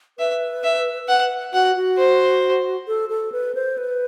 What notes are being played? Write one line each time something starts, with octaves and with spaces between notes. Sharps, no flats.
B4 E5
E5
B4 F#5
F#4 F#5
F#4
C5
A4
A4
B4
C5
B4